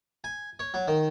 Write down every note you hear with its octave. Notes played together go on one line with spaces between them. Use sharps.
G#5
C#5
F#3
D#3